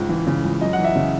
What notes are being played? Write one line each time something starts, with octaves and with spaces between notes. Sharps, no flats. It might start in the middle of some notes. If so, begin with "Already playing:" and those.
Already playing: C#2 G#2
E3
C#3
C#2
F#2 D#5
F#5
E3
E5
C#3